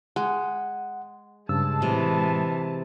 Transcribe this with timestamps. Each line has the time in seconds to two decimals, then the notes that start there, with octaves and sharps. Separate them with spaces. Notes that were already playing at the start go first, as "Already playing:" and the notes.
0.16 G#3 F#5
1.49 G2 C#3 G#3 A5 E6
1.82 A2 C3 E3